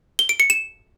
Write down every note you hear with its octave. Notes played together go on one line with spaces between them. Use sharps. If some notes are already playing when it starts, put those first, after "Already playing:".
G7
D7
C#7
E7